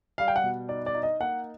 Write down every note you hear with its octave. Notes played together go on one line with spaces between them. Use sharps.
G3 F5
G5
F#5
B2
D#4 D5
D5
D#4
D#5
A#3 F#5